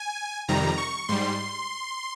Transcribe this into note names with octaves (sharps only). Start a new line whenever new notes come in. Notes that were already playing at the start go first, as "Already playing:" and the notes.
Already playing: G#5
F2 C3 D#3 G3 A#5
C#6
G#2 G3 C6